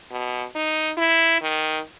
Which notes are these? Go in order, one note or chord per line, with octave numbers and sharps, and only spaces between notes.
B2
D#4
E4
D#3